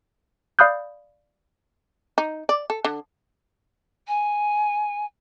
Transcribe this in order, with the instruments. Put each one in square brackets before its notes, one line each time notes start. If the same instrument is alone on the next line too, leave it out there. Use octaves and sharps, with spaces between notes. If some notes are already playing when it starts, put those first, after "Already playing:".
[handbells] D5 F5 B5 D#6 F#6 G6
[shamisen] D#4
D5
A4
D3
[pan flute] G#5